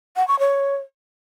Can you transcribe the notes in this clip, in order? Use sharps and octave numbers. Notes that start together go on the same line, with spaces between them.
F#5
C#6
C#5